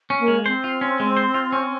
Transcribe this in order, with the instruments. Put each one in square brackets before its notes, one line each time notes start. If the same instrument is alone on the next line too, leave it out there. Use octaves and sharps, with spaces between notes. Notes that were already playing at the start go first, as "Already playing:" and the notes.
[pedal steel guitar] C#4
[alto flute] A#3
[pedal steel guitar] G#3
[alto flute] C4 [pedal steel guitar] C5
[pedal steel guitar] F4
C#4
G#3
C5
F4
C#4